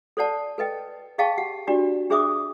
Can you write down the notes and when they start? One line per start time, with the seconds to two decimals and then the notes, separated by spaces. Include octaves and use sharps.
0.17 A4 C5 D5 F#5 A5
0.58 A4 B4 D#5 G5
1.18 G#4 D#5 F5 G5 A5 C#6
1.38 G4 F#5
1.67 D4 F#4 G4 D5
2.10 D4 G#4 C5 E5 D6 D#6